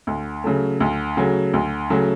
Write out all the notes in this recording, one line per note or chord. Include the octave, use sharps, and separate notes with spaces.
D2
C#3 F#3 A3
D2
C#3 F#3 A3
D2
C#3 F#3 A3